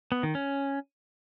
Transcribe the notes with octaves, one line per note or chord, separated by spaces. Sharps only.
B3
D#3
C#4